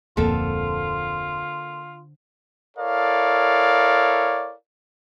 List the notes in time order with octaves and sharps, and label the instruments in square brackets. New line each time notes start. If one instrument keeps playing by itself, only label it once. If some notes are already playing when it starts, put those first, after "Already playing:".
[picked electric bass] D1 F2 A#2 [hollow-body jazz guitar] D3 C4 [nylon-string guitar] A#3 A4 [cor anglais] F4
[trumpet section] E4 A4 A#4 C#5 D5 F5